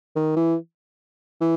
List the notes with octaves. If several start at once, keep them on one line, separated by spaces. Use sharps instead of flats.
D#3
E3
E3